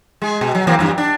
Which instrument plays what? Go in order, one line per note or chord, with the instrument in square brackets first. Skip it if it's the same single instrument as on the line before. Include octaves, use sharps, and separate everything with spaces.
[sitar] G#3 G#4
B2
F#3
E3 A#3 C4
E2 G2 G4
D4